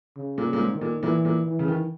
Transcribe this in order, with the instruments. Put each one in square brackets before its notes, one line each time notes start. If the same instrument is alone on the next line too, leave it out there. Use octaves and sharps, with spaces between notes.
[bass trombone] C#3
[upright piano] A#2
[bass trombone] C#3
[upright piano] A#2
G#2
[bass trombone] D#3
[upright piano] A#2
[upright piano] A#2 [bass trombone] E3
[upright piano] A#2
[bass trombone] E3
[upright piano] C#3
D#3